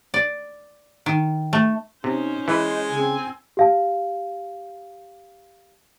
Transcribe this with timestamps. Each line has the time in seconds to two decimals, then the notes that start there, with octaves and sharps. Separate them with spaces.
0.14 D5
1.06 D#3
1.53 A3
2.04 C3 C#4 D#4 C5
2.48 E3 G#3 B4 D#5
2.90 C#3 C4 G#5
3.57 G4 F5 A5